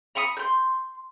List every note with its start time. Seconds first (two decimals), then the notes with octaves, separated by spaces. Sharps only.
0.15 A#5 B5 C#6 D#6
0.37 C6 G6